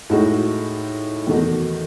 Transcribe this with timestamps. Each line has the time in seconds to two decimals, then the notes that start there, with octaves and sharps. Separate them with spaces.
0.10 A2 G#3 D#4 F#4
1.27 E2 D#3 A3 D#4 F#4